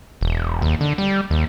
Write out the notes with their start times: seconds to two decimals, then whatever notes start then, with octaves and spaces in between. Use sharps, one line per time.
0.21 E1
0.62 D#2
0.81 D3
0.98 G3
1.31 D#2